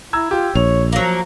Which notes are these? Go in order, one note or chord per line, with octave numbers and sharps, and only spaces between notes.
E4 A#5 E6 G#6
F4 G4
A#1 C#5 F7
F3 F#3 A#3